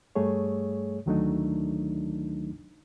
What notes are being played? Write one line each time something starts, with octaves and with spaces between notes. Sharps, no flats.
G2 G3 A3 G#4 C#5
D2 D#3 F#3 A3 D4 D#4